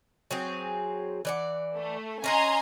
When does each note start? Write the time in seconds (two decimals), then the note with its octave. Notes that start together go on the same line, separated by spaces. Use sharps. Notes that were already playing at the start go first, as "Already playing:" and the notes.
0.31 F#3 C4 G#4
1.25 E3 D5 F#5
1.75 A3
2.24 C#4 D#5 F#5 G#5 A#5 C6